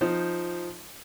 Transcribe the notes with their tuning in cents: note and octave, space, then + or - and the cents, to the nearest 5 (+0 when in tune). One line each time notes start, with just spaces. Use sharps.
F3 +0 D#4 +0 C5 +0